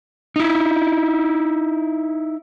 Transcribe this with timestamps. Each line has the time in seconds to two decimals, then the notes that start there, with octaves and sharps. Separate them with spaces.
0.36 D#4 E4